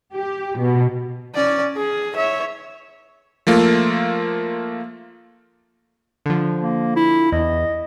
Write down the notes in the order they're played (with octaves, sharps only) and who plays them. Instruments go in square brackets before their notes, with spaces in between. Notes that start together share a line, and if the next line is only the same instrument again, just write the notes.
[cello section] G4
B2
[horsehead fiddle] C#4 D5
G#4
C#5 E5
[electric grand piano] F3 A3 A#3 F4
[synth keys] D3 F3
[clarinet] A#3
E4
[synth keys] E2 [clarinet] D#5